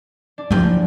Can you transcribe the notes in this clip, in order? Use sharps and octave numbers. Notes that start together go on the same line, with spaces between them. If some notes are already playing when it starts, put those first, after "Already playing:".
D4
G1 F3 F#3 E4 G5